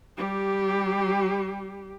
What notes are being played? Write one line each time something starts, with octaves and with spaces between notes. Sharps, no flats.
G3 G4